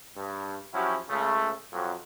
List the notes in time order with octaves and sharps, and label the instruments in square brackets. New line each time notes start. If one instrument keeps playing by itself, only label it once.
[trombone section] G2
F3 F#3 C#4 E4 F#4 G4
C#2 C#3 A3
F2 F#3